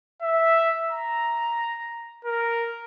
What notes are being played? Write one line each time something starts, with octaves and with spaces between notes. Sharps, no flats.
E5
A#5
A#4